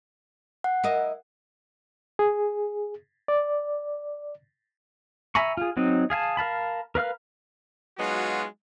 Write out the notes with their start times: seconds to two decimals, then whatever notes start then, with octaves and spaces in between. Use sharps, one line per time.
0.64 F#5
0.84 E4 A#4 D#5
2.19 G#4
3.28 D5
5.35 E5 G#5 A#5 B5 C#6
5.57 F4 G#4
5.77 F#3 C4 D#4
6.10 G#4 F5 G#5 A5
6.37 A#4 F5 A5 B5
6.95 A#4 B4 F5 F6
7.98 F#3 G#3 B3 D#4 F4 F#4